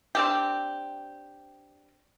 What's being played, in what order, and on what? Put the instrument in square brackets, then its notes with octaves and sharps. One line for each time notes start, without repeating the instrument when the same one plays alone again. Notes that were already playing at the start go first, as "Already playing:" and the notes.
[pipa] C4 D4 G4